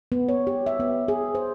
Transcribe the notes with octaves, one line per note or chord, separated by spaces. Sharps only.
B3
C#5
G4
E5
B3
G#4
C5